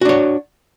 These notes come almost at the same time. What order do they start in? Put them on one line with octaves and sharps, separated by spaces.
F#4 D4 C#5